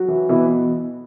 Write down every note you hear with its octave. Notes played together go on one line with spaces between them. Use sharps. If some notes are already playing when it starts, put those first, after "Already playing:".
Already playing: F#3 F#4
E3
B2 E3 E4